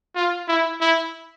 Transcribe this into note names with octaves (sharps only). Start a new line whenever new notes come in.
F4
E4
E4